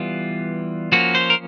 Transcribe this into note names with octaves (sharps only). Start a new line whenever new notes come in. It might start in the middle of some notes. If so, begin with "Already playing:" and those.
Already playing: E3 G3 B3 F4
F3 A#3 C#4 F#4
C5
A#4